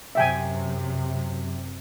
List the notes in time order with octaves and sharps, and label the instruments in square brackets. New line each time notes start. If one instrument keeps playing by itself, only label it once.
[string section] F#2 [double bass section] C3 [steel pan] E5 G5 G#5